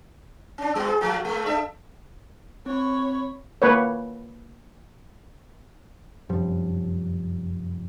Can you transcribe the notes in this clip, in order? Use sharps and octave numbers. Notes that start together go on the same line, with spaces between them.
C#4 D4
G3 B3 F#4
G#4
F3 A3 F#4
G#3 A3
D4 A4 E5
C4 C#5 B5
A#3 B4 C#5
F1 F#2 F3 G3